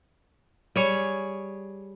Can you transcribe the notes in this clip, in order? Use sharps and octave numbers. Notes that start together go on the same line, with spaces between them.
G3 G#4 C#5